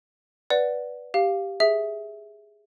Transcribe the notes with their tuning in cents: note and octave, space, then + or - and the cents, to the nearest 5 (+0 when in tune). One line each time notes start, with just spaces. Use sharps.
B4 +0 D5 +0 F#5 -5
G4 +0 F5 +0
G#4 +0 E5 -10